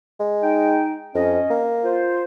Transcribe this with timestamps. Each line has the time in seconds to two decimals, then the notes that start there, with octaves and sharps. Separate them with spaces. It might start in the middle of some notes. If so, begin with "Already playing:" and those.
0.20 G#3
0.42 D#4 G5
1.15 F2 C#4 D#5
1.50 A#3
1.84 F4 C5